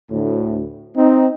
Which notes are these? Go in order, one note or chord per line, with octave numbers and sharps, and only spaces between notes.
D2 A2
C4 D#4